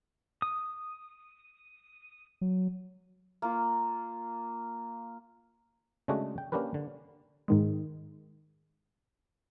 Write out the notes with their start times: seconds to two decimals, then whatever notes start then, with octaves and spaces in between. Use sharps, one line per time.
0.42 D#6
2.41 F#3
3.42 A#3 F4
6.08 C#3 G#3 A3 D4 F#4 G#4
6.38 G5
6.52 A#3 C#4 D4 G4 A#4 B4
6.74 D3
7.48 G#2 D#3 G#3